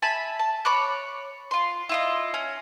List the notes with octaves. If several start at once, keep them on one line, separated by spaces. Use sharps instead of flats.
E5 G#5 A5 B5
A5
C#5 B5 D6 F#6
F4 C6
E4 F4 D#5
C#4